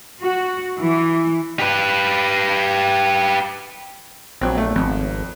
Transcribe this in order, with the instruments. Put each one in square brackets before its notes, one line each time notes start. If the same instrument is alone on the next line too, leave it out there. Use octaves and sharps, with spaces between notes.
[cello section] F#4
E3
[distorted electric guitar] G4 B4
[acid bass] A#1 [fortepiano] F#3 C4
[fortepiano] A3
[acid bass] G#1 [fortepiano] F2